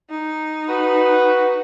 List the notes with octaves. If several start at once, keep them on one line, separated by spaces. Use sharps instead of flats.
D#4
F#4 B4